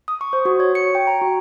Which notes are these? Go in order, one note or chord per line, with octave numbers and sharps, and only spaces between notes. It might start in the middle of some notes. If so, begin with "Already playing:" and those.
D#6
C#6
C5
F#4
C#5
C#7
G5
A#5
F#4